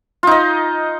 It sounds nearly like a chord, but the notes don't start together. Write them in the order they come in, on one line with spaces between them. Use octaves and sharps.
F4 D#4 D#5